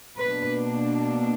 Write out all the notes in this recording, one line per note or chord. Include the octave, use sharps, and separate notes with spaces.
B2 A#3 D4 B4